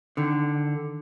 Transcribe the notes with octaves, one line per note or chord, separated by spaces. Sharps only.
D3 D#3